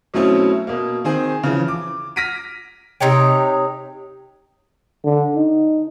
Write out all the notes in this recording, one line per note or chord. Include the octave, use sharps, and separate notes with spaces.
B2 F#3 A3 C4 C#4 E4
B2 A#3
D#3 C4 G#4
C#3 E3 F3
D6
F6 A#6 B6 D7 D#7
C3 D#4 C#5 G5
D3
D#4